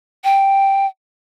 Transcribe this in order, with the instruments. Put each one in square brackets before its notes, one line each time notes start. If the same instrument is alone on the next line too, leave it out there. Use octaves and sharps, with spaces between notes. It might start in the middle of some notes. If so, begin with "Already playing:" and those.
[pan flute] G5